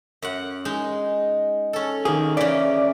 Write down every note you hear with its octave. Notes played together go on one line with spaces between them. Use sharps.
F#2 F#5
G#3 D#4
C#4 A4
D#3 A#3 G#4
C#3 E3 D5